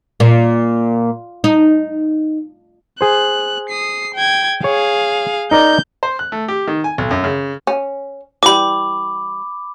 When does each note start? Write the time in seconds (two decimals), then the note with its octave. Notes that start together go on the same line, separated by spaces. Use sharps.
0.20 A#2
1.44 D#4
3.01 G#4 C5 F#6
3.69 D#6 C7
4.15 G5 G#6
4.64 G#4 C#5 F5
5.51 D#4 A#4 D5 G6
6.03 C5
6.19 F#6
6.32 A3
6.48 G4
6.67 D#3
6.84 G#5
6.98 B1
7.11 F#2
7.24 C#3
7.67 C#4
8.43 E3 G3 B5 D6